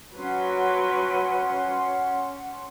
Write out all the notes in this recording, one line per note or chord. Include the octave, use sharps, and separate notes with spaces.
F#3 C#4 B4 F#5 C6